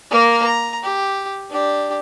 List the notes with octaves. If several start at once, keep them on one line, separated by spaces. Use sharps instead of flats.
A#3 A#4
A#5
G4
D4 G4